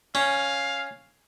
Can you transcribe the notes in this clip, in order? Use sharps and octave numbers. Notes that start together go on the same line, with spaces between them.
C#4 F5